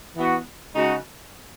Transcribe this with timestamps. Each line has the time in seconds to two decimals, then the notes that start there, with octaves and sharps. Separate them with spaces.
0.15 E3 B3 F#4
0.75 C#3 G#3 D#4 F#4